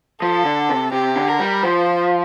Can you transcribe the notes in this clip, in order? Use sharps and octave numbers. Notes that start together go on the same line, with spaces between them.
F3 A4
D3
C3
C3 G4
D3
A#4
G3
F3 C5